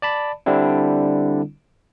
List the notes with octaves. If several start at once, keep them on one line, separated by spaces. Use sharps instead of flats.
D5 A5 B5
D3 G3 C4 D4 E4